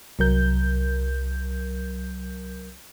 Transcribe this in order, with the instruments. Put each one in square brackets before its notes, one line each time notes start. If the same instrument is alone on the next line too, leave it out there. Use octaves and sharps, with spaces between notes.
[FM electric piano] C2 F#3 A#4 G6